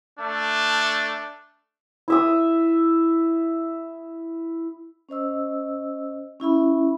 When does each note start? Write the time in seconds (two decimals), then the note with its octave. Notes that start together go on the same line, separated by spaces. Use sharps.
0.18 A3 D4
2.08 E4 E5 D#6
5.09 C#4 C5 D#5 E6
6.40 C#4 E4 E5 B5